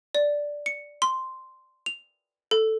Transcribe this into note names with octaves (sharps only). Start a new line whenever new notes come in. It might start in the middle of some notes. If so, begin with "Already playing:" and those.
D5
C#7
C6
F7
A4